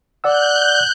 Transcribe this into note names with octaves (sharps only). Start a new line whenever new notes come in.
D5 F#5 E6 F#6 G6